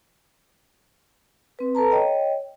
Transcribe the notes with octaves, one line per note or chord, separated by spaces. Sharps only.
C4 B4
A4 B4 A5 A#5
C#5 D#5 G5